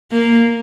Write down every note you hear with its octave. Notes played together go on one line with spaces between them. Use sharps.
A#3